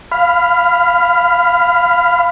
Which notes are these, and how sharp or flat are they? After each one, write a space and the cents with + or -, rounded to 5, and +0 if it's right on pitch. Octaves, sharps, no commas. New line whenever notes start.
F5 +0 B5 +20